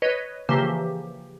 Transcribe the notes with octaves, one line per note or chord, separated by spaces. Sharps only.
B4 C#5 D#5
C#3 E3 F3 A#3 G4 C5